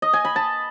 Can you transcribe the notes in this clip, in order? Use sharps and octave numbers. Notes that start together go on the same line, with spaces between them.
D#5
G#5
B5
A5